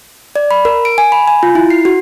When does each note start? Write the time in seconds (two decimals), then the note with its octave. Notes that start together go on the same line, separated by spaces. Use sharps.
0.36 D5
0.51 B5
0.65 A#4
0.85 D7
0.98 G#5
1.12 B5
1.28 G#5
1.43 F4
1.55 E4
1.70 C7
1.85 F#4